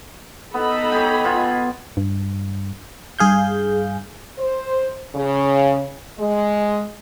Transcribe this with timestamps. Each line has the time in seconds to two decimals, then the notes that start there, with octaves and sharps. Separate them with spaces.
0.54 B3 D#4 A4 B5
0.92 G4 G#4 C#5
1.24 B2 F4 G#5
1.97 G2
3.19 G2 G#4 F5 G6
4.39 C5
5.15 C#3
6.19 G#3